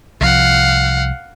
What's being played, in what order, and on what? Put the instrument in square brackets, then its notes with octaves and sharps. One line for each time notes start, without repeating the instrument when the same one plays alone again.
[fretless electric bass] C2 F3 [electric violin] F5 F#5